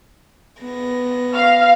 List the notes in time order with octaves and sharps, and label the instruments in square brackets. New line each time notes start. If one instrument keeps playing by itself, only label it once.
[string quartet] B3 A#6
[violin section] F5